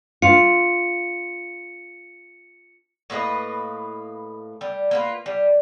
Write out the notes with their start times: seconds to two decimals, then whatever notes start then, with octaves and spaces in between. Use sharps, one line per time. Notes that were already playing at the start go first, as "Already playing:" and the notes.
0.22 F4 C#7
3.10 A2 A#3 B4 D#5
4.61 G3
4.91 A#3 F4 B4
5.26 G3